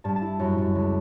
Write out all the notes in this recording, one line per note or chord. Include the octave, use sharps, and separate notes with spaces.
G2 A5
A5
E4
F#2
F#2
C#2